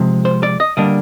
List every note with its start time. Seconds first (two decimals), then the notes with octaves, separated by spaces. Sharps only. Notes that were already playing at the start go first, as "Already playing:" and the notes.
Already playing: C3 F3 G#3
0.25 C5
0.43 D5
0.60 D#5
0.77 D3 G3 A#3 D4 D#5